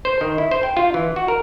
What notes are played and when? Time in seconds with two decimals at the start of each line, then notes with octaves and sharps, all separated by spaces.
0.05 C5
0.21 D#3
0.38 E4
0.51 C5
0.63 G5
0.77 F4
0.94 E3
1.16 F#4
1.28 A#4